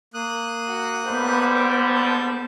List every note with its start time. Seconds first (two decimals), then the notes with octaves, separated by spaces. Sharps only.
0.14 A#3 D#6 F#6
0.68 F#4
1.05 G#2 D3 G3 B3 C5
1.55 D6
1.94 A5